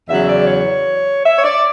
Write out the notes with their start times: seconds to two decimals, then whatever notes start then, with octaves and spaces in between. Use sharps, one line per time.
0.09 E2 C#3 F#3 E5
0.29 D5
0.47 C#5
1.24 E5
1.38 C#5
1.44 D5